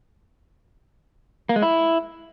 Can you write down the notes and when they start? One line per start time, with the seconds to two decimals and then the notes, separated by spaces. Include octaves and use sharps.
1.49 A#3
1.56 G#3
1.62 E4